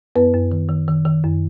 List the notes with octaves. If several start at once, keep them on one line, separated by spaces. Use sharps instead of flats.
F#2 B3 B4
F#2
D#3
D#3
D#3
D#3
F#2